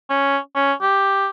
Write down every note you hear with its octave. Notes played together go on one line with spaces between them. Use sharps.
C#4
C#4
G4